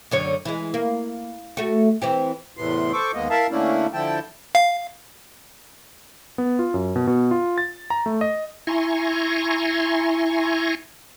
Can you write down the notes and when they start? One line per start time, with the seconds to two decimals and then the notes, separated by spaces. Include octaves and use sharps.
0.11 F#2 D3 C#5
0.45 E3 G#3
0.74 A#3
1.57 A3 F#4
2.02 E3 C4 G4
2.57 E2 A2 C3 B3 C6
2.92 A4 C5 C#6 D6
3.14 D#2 G#3 A#3 B3 D#5
3.30 E4 A#4 E5 F5 A5
3.51 D3 A3 A#3 C#4 D4 E4
3.93 D3 F3 E4 G5 A5
4.55 F5
6.38 B3
6.59 F4
6.74 F#2
6.96 B2
7.07 B2
7.31 F4
7.58 A6
7.90 A#5
8.06 A3
8.21 D#5
8.67 E4 G#5 A#5 C6 C#6